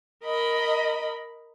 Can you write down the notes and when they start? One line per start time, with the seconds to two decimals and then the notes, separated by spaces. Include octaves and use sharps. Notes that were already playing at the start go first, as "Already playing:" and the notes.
0.24 A#4 D#5 B5